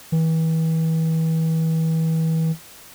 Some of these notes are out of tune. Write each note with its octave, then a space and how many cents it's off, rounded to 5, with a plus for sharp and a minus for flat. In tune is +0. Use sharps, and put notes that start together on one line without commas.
E3 -35